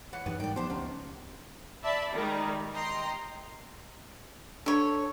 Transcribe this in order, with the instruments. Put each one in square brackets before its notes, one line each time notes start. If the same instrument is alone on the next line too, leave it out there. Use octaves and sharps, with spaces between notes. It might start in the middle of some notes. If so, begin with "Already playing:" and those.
[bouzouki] E3 C#5 F#5
[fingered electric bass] F#2 E3 [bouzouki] G3 B3 B4 [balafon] D#4
[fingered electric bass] G#2 [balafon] G3 D#4 A#4 [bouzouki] D5 G5
[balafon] F3 G4 A5 [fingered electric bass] B3 [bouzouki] D4 C5
[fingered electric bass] C#2 C#4 [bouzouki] D#3 [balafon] F#5
[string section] D5 E5 A5 B5
D#3 G3 G#3 D#4
D#5 G5 A#5 C6
[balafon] D4 [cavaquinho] A4 C#5